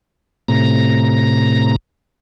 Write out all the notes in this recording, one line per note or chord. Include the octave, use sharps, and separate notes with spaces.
A2 C3 A#5